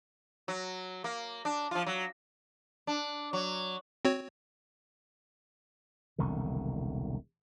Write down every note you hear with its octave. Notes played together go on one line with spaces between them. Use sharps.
F#3
A#3
D4
F3 F4
F#3
D4
F#3
C4 F#4 C#5
E1 C2 D3 D#3